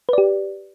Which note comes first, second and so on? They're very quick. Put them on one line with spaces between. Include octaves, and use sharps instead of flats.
B4 D5 G4